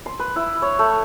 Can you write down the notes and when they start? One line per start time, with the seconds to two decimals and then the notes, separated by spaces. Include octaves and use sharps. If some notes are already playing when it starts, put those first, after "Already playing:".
0.06 C6
0.19 B4
0.36 E4
0.62 C#5
0.79 A3